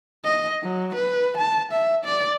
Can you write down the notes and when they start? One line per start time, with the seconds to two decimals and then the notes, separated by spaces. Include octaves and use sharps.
0.24 D#5
0.63 F#3
0.95 B4
1.38 A5
1.72 E5
2.05 D5